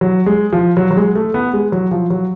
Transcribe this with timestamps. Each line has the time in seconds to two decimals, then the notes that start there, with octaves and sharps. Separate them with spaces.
0.01 F#3
0.26 G#3
0.53 F3
0.77 F#3
0.91 F#3
0.97 G#3
1.15 A3
1.34 B3
1.53 G#3
1.72 F#3
1.91 F3
2.10 F#3